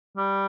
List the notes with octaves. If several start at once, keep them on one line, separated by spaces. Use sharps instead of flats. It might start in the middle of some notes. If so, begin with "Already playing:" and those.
G3